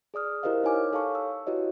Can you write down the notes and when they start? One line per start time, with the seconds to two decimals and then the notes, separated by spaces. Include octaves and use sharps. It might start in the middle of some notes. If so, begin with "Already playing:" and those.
0.14 G#4 D5 D#6 F6
0.43 E4 G4 A#4 C5 D#5 F5
0.64 D#4 C#5 G#5 D6 F6
0.93 A4 C#5 F5 A5 C#6
1.15 E6
1.47 E4 F#4 G4 B4 C#5 D#5